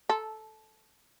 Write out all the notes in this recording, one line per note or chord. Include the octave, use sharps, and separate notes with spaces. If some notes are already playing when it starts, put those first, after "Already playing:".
A4